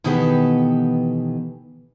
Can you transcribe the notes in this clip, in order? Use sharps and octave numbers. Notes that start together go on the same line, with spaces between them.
B2 D#3 E3 B3 G4 A4